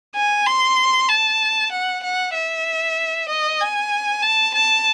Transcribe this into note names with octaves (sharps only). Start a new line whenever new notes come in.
G#5
C6
A5
F#5
F#5
E5
D#5
G#5
A5
A5